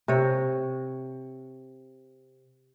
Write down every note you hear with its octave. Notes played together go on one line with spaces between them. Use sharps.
C3 C#5